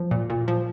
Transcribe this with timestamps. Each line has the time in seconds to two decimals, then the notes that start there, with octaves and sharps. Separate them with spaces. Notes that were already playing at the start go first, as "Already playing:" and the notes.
Already playing: F3
0.11 A#2
0.30 A#2
0.48 F3